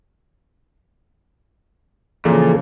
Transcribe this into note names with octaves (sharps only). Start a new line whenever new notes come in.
A#2 C#3 E3 F3 G#4 A4